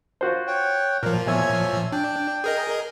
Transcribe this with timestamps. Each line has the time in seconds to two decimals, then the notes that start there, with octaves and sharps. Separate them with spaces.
0.21 F4 F#4 C5
0.47 C#5 F#5 G5
1.03 A#2 F3 A#4 C5
1.27 E2 C#5 E5 G#5
1.92 D4 G5
2.44 G#4 A#4 D#5